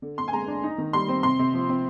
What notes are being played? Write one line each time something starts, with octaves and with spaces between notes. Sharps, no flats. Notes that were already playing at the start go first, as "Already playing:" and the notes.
D3
D3 C6
G#5
G#3 A#5
D4
D#4
D#3
G3 C6
C4
C3 C6
C3
F3
C4